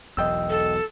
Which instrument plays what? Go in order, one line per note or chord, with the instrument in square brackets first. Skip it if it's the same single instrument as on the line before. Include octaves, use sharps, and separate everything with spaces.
[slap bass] E1 B1 E2 [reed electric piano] D#5 G5 E6
[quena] A4